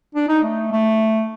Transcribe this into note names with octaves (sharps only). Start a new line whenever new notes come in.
D4
D#4
A3
A3